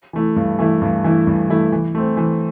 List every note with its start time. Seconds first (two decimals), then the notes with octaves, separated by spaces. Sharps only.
0.13 E3 A3 E4
0.36 G2
0.59 E3 A3 E4
0.82 G2
1.04 E3 A3 E4
1.27 G2
1.50 E3 A3 E4
1.72 E3
1.95 A3 C4
2.17 E3